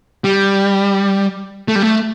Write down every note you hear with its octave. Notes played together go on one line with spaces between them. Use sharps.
G3
A3
G3
A3